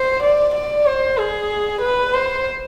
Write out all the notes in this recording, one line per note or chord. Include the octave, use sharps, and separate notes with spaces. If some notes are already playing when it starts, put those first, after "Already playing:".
Already playing: C5
D5
D5
C5
G#4
B4
C5